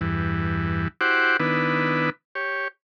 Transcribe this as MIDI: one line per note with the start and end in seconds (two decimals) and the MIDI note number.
0.01 0.88 40
0.01 0.88 43
0.01 0.88 52
1.01 1.37 64
1.01 1.37 66
1.01 1.37 67
1.01 1.37 72
1.01 1.37 78
1.01 1.37 86
1.40 2.10 51
1.40 2.10 59
1.40 2.10 62
1.40 2.10 64
1.40 2.10 71
2.35 2.68 67
2.35 2.68 73